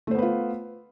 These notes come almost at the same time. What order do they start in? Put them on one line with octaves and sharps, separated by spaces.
A3 C5 B3 B4 F4